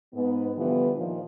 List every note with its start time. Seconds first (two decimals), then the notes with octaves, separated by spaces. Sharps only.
0.14 G#2 B3
0.57 D3 E3 F3 G3 B3
0.96 A#2 D#3 F3